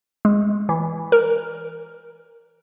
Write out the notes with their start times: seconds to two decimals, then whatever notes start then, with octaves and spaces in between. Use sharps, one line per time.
0.25 G#3
0.69 E3
1.12 A#4